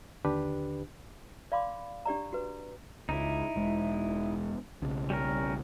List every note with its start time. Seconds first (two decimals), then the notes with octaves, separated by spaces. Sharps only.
0.25 D#2 D3 D4 G4 B4
1.52 D5 F5 B5 C6 D6
2.06 D4 G4 D5 A#5
2.33 F#4 B4
3.09 C#2 D#4 E4
3.56 E1 G#3
4.82 B1 C#3
5.10 G3 C#4 A#4